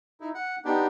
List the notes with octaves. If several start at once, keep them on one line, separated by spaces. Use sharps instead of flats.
D#4 E4
F#5
B3 D4 D#4 G4